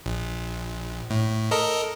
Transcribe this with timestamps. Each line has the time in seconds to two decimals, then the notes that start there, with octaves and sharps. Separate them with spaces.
0.06 A#1
1.10 A2
1.51 A4 A#4 D#5